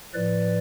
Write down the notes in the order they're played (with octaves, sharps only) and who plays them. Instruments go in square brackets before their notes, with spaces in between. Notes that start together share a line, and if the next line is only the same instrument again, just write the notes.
[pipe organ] A2 F3 B4 D5